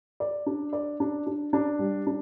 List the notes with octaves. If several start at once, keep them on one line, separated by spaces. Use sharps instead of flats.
D5
D4
D5
D4
D4
D4
G3
D4